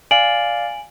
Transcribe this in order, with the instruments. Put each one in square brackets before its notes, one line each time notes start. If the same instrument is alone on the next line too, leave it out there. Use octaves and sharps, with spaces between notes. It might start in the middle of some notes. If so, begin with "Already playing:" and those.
[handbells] D5 F5 [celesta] G#5 D7 F#7